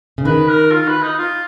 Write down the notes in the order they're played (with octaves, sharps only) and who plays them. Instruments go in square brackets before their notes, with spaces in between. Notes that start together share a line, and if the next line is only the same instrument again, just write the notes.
[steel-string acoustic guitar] C#3
[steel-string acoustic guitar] D#3 [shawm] B4
[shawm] A#4
F4
B4
D#4
F4